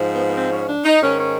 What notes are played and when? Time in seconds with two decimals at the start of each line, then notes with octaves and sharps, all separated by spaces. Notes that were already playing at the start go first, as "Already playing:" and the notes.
Already playing: G#2 F3
0.13 B3
0.25 B3
0.35 C4
0.52 C#4
0.67 D4
0.84 D#4
1.01 G#2 D#3 C#4
1.18 C#4